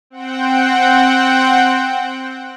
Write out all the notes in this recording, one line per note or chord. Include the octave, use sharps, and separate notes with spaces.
C4 F#5 G5